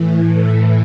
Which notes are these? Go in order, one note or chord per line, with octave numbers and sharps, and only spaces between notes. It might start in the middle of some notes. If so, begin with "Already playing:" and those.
Already playing: A2 E3
A4